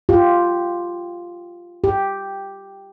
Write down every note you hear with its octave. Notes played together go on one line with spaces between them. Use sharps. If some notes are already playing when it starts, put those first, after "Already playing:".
F4 G4
G4